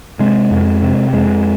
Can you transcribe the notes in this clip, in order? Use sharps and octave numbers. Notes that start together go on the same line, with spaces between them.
C3 G#3
F2
C3
F2 G#3